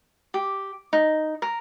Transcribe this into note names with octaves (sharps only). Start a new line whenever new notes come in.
G4
D#4
A#4